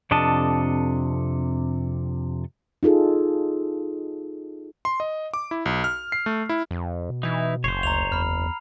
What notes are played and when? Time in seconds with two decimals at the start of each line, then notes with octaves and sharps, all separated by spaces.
0.11 F2 C3 D4 A4 D#5 A5
2.83 D#4 F4 G#4 A4
4.85 C6
5.00 D#5
5.34 D6
5.51 E4
5.66 B1
5.84 F6
6.12 C7
6.26 A3
6.49 E4
6.71 F2
7.09 B2
7.23 E3 D#4 E4
7.64 F#1 C5 C#5 C7
7.83 D2 A#5 F7
8.12 E2 B5 F6